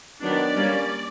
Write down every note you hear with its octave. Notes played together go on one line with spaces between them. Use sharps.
D#3 F#3 B3 D4 D5
G3 A#3 C#4